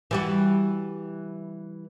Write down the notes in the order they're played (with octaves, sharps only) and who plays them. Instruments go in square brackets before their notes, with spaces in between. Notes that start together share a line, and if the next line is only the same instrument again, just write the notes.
[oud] E3 G3 F#4